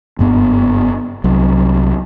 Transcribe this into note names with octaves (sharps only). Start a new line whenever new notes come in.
F#1 G2 B3
C2 F#3